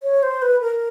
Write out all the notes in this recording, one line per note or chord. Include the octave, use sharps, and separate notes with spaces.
C#5
C5
B4
A#4